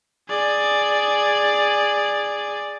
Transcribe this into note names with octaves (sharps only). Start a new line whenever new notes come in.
G#4 D5